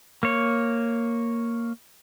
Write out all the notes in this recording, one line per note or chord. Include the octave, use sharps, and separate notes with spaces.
A#3 C#5